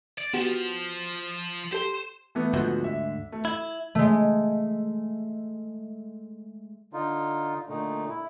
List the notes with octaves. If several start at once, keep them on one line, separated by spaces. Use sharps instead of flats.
D5
F3 B3 F#4 G4
G4 A4 C5
E3 A3 B3
D2 G#2 D3 F3 B3 F#4
E5
A3
E4 G#6
G#3 A3
D3 D#4 F4
A#2 D3 A3 D#4
E4